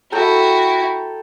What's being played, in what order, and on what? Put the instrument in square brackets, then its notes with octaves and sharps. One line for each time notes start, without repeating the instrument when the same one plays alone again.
[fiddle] E4 F#4 [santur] A4 G5 A#5